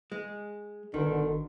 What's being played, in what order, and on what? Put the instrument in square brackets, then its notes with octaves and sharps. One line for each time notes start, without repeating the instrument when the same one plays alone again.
[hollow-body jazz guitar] G#3
[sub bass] G1 [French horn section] B2 D3 [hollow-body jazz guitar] D#3